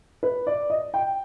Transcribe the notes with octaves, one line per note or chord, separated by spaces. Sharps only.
B4
D5
D#5
G5